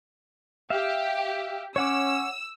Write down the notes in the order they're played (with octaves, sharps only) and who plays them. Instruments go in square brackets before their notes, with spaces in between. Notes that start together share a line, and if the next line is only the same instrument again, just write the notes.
[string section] G4 [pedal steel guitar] E5 F5
[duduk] C#4 [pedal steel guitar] C#5 F#5 D6 [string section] E6